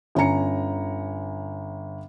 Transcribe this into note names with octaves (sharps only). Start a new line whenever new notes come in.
G1 C#4 G#5 A#5 C#7